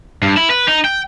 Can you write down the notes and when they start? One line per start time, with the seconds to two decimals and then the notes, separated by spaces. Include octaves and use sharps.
0.22 G2
0.37 E4
0.50 B4
0.68 D#4
0.85 G5